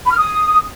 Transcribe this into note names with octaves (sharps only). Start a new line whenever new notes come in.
B5
F6
D#6